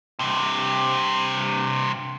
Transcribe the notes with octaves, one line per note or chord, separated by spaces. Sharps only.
G2 C3